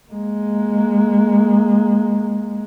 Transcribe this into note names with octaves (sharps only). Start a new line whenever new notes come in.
G#3 A#3